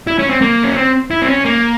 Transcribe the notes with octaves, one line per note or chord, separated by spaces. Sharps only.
E4
C#4
C4
A#3
C#4
C4
E4
C4
C#4
A#3